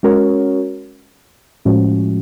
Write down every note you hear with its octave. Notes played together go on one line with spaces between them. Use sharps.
G#3 C#4 F#4 A#4 C#5
A2 F3 G#3 C#4 F#4